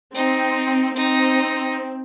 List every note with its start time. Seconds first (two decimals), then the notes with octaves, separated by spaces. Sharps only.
0.15 C4 D#4
0.96 C4 D#4